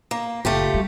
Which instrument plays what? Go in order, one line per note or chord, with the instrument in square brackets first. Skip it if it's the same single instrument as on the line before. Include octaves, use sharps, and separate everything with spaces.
[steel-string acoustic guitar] A#3
[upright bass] F#1 [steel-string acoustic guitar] A3 F4 G4
[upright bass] G3